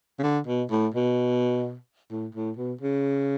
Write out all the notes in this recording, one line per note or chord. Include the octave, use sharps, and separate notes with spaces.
C#3
D3
B2
A2
B2
A2
A2
B2
C#3